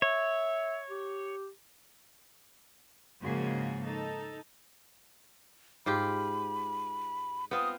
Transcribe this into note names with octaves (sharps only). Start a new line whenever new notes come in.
C#5 E5
G4
G#2 C#3 F3 A#3 F#4 G#4
D#4 A4
G#2 F4 G4 B5
B3 C4 F4 D#6